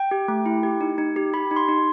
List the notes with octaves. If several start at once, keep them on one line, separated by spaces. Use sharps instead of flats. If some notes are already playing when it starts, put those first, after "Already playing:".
Already playing: G5
G4
A3
E4
G4
D#4
D#4
G4
G4 B5
D#4
C6
D#4